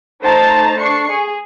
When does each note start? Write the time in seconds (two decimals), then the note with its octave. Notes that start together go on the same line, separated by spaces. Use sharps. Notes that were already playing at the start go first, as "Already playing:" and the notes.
0.21 A3 D#4 C5 A5 A#5 A6
0.80 D4 C#6 C7 C#7
1.11 G#4